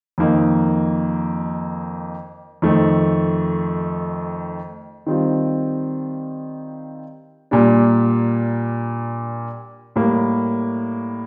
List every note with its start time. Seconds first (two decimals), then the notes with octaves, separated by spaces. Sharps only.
0.18 F2 D#3 A#3 D#4
2.62 F2 D#3 A3
5.07 D#3 G3 C4 F4
7.51 A#2 G3 A#3 D4
9.96 A2 G3 A#3